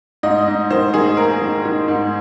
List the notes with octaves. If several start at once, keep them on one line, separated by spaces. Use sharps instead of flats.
G#2 D#5
G#2
D#3 C5
D#3 G#4
A#3 A#4
D#3
D#3
G#2